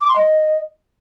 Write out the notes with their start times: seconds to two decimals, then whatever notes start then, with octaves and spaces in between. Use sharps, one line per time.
0.01 D6
0.08 C6
0.15 D#5